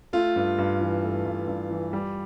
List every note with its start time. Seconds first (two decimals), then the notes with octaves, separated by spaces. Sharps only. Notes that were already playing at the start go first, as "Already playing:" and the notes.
0.13 A3 F4
0.36 G2
0.58 G2
0.81 E3
1.03 A3
1.25 G2
1.48 G2
1.71 E3
1.93 G3